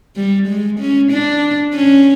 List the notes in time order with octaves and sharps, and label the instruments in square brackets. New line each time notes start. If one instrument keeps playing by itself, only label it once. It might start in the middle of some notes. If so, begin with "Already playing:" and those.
[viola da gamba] G3
G#3
C#4
D4
C#4